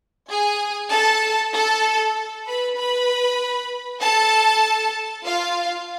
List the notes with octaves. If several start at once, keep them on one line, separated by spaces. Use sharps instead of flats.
G#4 G#5
A4 A5
A4 A5
B4 B5
B4 B5
A4 A5
F4 F5